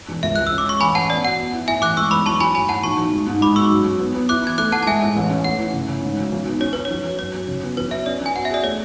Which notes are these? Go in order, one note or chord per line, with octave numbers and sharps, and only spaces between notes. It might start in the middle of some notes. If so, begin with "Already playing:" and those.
E1
C#2 E5
G#3 F#6
E6
C#4
D6
C#4 C#6
A1 G#5 B5
A1 F#5 A5
B3 D5
B2 F#5
B3
E4
A2 E5 G#5
A1 D6 F#6
G#3 C#6 E6
E2 B5 D6
F#3 A5 C#6
F#3 G#5 B5
A2 G#5 B5
A2 F#5 A5
B1 A5 C#6
B1
G#3
G#2
G#3 B5 D6
B2 C#6 E6
F#2
F#2
B3
B3
E4 D6 F#6
E3 G#6
A3 D6 F#6
A3 F#5 A5
A5
G#3 E5 G#5
A2
A1
C#4
A3 F#5
E3
C#3
C#3
G#2
G#1
B1
B3
C#4 C#5
C#4 B4
C#5
F#3
F#3
F#2 C#5
F#2
C#3
B3
F#3 B4
B3 E5
C#4 D5
C#4
G#5
B2 F#5
E5
G#4 D5
A3 C#5